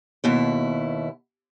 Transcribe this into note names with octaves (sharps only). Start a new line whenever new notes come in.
D#2 B2 E4